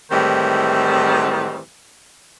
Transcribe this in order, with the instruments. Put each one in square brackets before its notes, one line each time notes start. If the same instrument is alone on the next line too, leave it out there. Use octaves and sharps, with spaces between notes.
[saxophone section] A2 D#3 E3 G3 G#3 C4